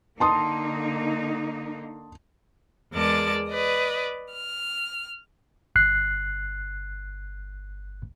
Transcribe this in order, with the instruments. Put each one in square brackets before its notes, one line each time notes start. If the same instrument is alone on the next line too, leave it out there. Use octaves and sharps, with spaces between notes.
[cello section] D3 A#3 D#4 [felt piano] A5 C6 D#6
[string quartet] E2 G#3 A#4 D5 A5 A6
B4 D5 D#5
F6
[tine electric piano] G1 F#6 C7